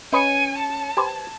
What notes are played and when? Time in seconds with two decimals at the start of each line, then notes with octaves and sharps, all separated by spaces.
0.13 C#4 B4 C#5 D#5 G#5 C#7
0.58 A5
0.97 G4 B4 C5 G#6